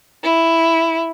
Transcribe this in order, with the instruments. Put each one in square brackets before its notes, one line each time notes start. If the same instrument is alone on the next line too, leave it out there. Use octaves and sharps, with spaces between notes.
[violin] E4